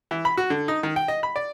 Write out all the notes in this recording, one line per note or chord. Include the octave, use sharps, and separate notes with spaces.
E3
B5
F#4
D3
D#4
D#3
G5
D#5
B5
D5